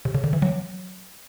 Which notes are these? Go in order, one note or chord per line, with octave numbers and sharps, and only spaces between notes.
C3
C#3
D3
E3
F#3